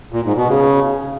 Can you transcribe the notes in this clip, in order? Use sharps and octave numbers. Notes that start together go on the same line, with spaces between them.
A#2
G#2
B2
C#3